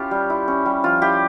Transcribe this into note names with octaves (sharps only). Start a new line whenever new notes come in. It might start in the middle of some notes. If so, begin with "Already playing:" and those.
Already playing: C#4 E4 F4 G4
G3
E4
C#4
G3
F3 F4
E4 G4